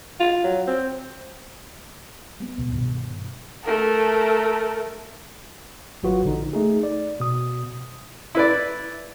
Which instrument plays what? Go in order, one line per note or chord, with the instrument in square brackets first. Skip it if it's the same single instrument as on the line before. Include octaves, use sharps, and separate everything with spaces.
[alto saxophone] F4
F#3
C4
[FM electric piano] G3 B3
[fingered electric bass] C#2 B2
G2 B2 D#3
[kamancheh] A3 A#4
[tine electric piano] G#1 F#3 F4 F#4 B4
A#1 D3 D#4
A3 D#4 G#4
D5
B2 D#6
[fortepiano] E4 B4 D5